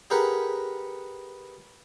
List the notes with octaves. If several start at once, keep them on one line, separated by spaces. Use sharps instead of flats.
G4 G#4 A#4 B4 F#5